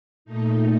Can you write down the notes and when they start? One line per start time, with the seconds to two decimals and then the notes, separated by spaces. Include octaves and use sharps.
0.25 A#2 A3 D#4